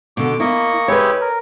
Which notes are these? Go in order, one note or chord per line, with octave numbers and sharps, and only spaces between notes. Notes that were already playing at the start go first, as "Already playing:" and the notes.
B2 D3 D6
A#3 E4 D#5 C#6
G#3 E4 G4 B4 C#5
A#4